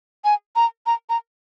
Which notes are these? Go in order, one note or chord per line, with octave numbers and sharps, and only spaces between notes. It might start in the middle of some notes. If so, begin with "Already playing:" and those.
G#5
A#5
A#5
A#5